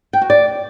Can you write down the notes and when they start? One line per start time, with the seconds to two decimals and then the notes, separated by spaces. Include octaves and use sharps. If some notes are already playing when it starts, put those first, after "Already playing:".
0.13 G5
0.22 F#4
0.30 D5